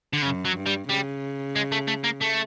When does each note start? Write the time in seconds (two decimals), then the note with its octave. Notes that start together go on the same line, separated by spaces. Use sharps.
0.13 D3
0.22 F#2 C#3
0.45 F#3
0.56 G2
0.67 G3
0.89 C#3 G3
1.56 G#3
1.72 A3
1.88 A3
2.04 A#3
2.22 A3